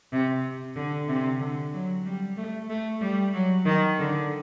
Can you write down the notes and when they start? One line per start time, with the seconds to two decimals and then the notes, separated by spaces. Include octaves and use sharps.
0.12 C3
0.76 D3
1.08 C3
1.40 D3
1.73 F#3
2.05 G3
2.37 A3
2.69 A3
3.01 G3
3.34 F#3
3.65 D#3
3.99 D3